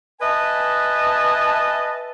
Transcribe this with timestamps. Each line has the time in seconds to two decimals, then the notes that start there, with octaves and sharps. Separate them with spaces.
0.20 B4 D#5 E5 G#5 A5